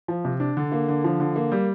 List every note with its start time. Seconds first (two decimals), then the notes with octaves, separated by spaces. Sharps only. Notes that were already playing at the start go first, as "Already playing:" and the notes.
0.08 F3
0.25 C3
0.40 D4
0.57 D3
0.72 A#3
0.88 D3
1.04 F3
1.20 D3
1.36 A#3
1.52 G3